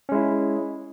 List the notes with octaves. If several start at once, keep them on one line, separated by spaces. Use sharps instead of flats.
G#3 C#4 E4